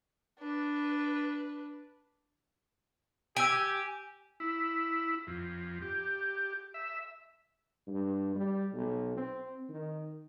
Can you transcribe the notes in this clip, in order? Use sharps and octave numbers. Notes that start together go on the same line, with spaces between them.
D4 B4
G4 G#5 E6 D7
E4
F2
G4
E5
G2
G3
B1
C4
D#3